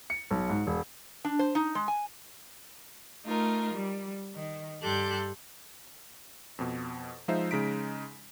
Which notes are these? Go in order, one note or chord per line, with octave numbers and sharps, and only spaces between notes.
C#7
B1
G#2
E1
D4
C5
D#4
G#3
G#5
A3 D#4 F4 A#4
G3
D#3
G2 G4 A4 C6 F#6 G6
F2 B2
F3 G#3 D#4 F4 C5 E5
C#3 G#3 D#4 B6 D7